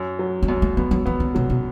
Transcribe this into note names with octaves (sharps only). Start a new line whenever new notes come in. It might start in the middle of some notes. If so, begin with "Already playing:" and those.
Already playing: F#2
F#3
C#4
F#2 B3
A3
F#3 B3
F#3
E3 B3
D3
B2 F#3
B2